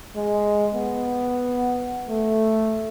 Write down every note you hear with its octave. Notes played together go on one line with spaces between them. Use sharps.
G#3
B3
A3